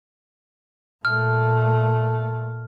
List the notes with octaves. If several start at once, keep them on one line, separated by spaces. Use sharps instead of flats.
A#2 A3 F6